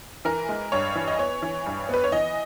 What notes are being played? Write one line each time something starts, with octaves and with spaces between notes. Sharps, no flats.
E3 A#4
G#3
G2 C#5
E3
D#5
B3 C#5
E3
G2
B3 B4
C#5
E3 D#5